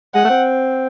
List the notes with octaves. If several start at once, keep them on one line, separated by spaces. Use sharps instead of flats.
G#3 F#5
A3
C4